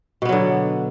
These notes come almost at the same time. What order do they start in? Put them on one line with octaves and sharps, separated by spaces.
B2 B3 F#3 D3